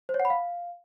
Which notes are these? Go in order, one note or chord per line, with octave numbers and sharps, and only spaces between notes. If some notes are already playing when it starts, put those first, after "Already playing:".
C5
C#5
F#5
B5
F5